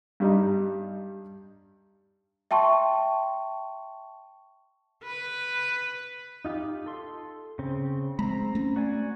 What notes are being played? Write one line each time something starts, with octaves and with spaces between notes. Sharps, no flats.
G2 G3 D#4
E5 G5 A5 C6 C#6
B4
D#4 F4 G4
A4 C6
C#3 C4
G#3 C4 A#5 B5
A3 C#4
F#4 D5 G#5